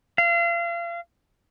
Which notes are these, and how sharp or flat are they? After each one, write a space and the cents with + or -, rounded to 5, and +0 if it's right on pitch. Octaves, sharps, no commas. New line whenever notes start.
F5 -35